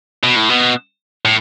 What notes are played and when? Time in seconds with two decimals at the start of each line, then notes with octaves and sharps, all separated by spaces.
0.24 B2
0.36 A2
0.49 B2
1.25 A2